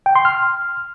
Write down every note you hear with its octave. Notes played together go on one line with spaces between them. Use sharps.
G5
C6
F6